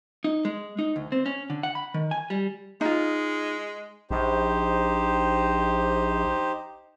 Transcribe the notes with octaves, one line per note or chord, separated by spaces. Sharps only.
D#4
G#3
D#4
D2
C4
C#4
D3
F#5
B5
D#3
G#5
G3
G#3 D#4 F4
A#1 D#4 G4 C5